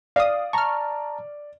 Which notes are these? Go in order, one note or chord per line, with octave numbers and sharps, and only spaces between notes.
D5 F5 D#6
A5 A#5 C#6 F6